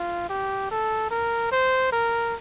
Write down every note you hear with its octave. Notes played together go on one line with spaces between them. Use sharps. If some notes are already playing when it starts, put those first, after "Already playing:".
Already playing: F4
G4
A4
A#4
C5
A#4